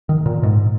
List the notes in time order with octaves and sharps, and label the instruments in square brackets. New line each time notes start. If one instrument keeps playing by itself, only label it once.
[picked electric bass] D#3
A#2
G#2